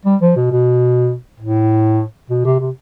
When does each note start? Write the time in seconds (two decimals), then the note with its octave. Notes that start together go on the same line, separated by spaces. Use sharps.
0.05 G3
0.21 F3
0.36 B2
0.51 B2
1.40 A2
2.30 B2
2.45 C3
2.60 C3